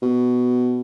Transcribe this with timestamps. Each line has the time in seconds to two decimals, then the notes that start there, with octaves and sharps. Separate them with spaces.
0.02 B2